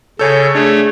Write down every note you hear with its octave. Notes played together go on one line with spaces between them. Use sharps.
C#3 A4 C#5 G#5 G6
A3 D4 G#4 C#5